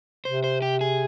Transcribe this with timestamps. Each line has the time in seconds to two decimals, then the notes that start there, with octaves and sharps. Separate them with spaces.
0.25 C3 C5
0.44 C5
0.62 G4
0.81 G#4